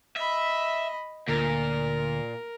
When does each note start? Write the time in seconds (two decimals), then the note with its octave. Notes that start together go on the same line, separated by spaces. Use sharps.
0.17 D#5 E5 B5
1.28 D2 A#2 A#4